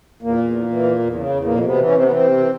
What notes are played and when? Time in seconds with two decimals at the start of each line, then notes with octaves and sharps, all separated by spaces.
0.22 E2 A#2 A#3
0.38 E2
0.53 E3
0.68 E3
0.83 E2
0.99 E2
1.14 C#3
1.30 E2
1.44 F2 A#2 A#3
1.60 C3
1.65 B2 B3
1.75 E3
1.85 C#4
1.91 C3 C4
2.03 E3 B3
2.11 C3 C4
2.21 C3
2.37 E3